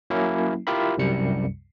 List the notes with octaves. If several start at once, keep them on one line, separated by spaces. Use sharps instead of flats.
F#3 A#3 C#4 E4
E4 F4 G4 A#4 E5 B5
C2 F#2 C3 G3 C#7